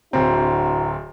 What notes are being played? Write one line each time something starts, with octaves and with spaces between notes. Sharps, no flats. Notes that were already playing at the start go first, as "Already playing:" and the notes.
D1 C4 D4 E4 F#4 A#5